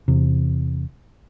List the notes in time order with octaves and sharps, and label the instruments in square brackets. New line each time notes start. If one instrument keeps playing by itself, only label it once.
[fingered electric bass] E2 C3